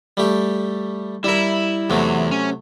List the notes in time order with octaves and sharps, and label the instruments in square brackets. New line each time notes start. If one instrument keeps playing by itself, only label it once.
[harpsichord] G3 A3 G4
[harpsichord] G3 A#4 [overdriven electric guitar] E4 E5
[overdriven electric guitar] E2 [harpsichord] C3 F#3 A3
[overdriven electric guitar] C#4